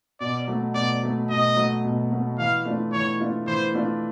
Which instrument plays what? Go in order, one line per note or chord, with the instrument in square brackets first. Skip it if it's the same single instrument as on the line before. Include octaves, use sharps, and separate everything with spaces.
[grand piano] B2 [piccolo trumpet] D5
[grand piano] F#3 A3
[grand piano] B2 [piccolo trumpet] D5
[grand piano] F#3 A3
[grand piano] B2 [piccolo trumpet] D#5
[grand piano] F#3 A3
B2
F#3 A3
[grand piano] E3 [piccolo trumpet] F5
[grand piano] A3 D4 F4
[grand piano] E3 [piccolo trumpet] C#5
[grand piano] A3 D4 F4
[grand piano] E3 [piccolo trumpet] C5
[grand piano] A3 D4 F4